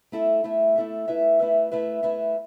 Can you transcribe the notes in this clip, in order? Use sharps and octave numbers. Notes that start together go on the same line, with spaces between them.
A3 E4 A4 E5
A3 E4 A4 E5
A3 E4 A4 E5
A3 E4 B4 E5
A3 E4 B4 E5
A3 E4 B4 E5
A3 E4 B4 E5